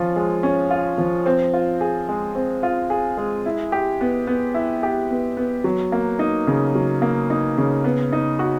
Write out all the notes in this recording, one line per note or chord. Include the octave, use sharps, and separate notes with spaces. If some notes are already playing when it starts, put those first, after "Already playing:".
Already playing: F3 C#4 F4
G#3
C#4
F4
F3
C4
F4
G#4
G#3
C4
F4
G#4
G#3
E4
G4
B3
B3
E4
G4
B3
B3
F#3
A#3
D#4
C#3
F#3
A#3
D#4
C#3
B3
D#4
F#4